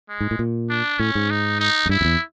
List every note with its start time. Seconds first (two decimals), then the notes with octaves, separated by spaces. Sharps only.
0.09 G#3
0.21 G#2
0.31 A2
0.39 A#2
0.70 D4
1.00 A2 C#4
1.15 G#2
1.30 D#4
1.60 D#4
1.86 F#2
1.89 G2 E4
2.01 F2
2.05 E2